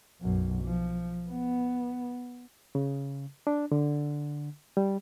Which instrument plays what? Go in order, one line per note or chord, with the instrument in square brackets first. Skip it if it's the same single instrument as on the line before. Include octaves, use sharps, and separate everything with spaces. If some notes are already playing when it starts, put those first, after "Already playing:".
[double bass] B1 F#2
F3
B3
[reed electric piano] C#3
D4
D3
G3